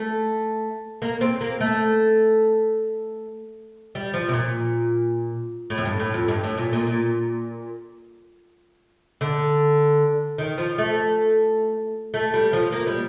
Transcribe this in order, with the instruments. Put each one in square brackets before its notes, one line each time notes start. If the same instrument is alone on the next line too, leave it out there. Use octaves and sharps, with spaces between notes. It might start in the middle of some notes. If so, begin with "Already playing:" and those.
Already playing: [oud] A3
A#3
C4
A#3
A3
G3
F3
C3
A#2
A2
F2
G2
A2
F2
G2
A2
A#2
A#2
A#2
D3
D#3
F3
A3
A3
G3
F3
A#3
G3